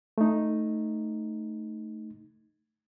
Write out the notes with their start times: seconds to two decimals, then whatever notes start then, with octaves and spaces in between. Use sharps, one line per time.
0.18 A3 D#4